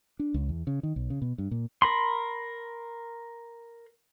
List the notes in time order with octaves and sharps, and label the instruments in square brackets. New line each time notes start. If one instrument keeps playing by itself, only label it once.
[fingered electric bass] D4
C#2
E2
C#3
D#3
B1
C#3
B2
G2
A#2
[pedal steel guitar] A#4 B5 C6